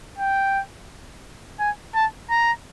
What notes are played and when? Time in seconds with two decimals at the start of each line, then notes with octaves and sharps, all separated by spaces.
0.18 G5
1.60 G#5
1.95 A5
2.30 A#5